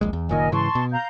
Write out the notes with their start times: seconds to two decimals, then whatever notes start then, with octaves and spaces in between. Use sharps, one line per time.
0.01 D#1 A#1 G#3
0.13 E2
0.29 F#1 A#2 D#3 A#4 D#5 G#5
0.52 G#2 C#3 E3 A5 C6 C#6
0.75 B2
0.92 F5 A#5 G6